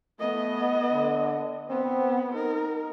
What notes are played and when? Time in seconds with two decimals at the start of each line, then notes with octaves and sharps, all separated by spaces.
0.20 A3 B3 D#5
0.91 D3
1.70 B3 C4
2.35 D#4 A#4